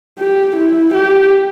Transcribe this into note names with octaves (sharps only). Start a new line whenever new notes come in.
G4
E4
G4